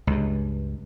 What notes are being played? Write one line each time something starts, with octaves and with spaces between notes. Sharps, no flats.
C#2 G2